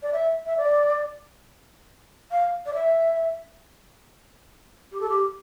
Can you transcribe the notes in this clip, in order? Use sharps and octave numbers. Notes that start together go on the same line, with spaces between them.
D5
E5
E5
D5
F5
D5
E5
G4
A4
G4